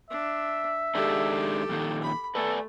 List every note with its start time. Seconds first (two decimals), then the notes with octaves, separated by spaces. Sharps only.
0.10 D4 E5
0.95 D#3 G#3 D4 G4 A4
1.69 F2 A#2 D#3
2.03 B5
2.35 A3 A4 B4 D5 G#5